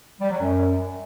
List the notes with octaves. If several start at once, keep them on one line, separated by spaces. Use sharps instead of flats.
G3
F#3
F#2